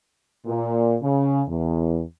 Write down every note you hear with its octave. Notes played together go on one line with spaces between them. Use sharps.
A#2
C#3
E2